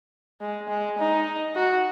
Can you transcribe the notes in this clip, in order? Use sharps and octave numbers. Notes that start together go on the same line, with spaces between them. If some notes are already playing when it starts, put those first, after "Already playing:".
G#3
G#3
D#4
F#4